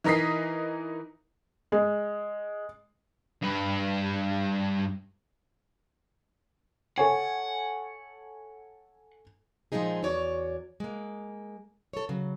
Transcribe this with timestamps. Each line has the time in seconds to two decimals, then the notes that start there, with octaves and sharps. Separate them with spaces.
0.04 E3 D#4 A#4 D#5 B6 C7
1.72 G#3
3.43 G2 B4
6.98 A4 C#5 F#5 G#5
9.72 A#2 F3 G#3 C4 D#4 G#4
10.03 E2 F#4 C#5 D5
10.80 G#3 A#3
11.93 A4 C#5
12.09 C#3 F#3